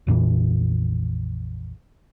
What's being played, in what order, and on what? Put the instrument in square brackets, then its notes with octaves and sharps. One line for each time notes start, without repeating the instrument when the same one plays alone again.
[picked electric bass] A#1 F2 A#2 E3